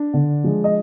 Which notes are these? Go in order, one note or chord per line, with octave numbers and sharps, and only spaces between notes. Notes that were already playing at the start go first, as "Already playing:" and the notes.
Already playing: D4
D3
F3 G#3
D#5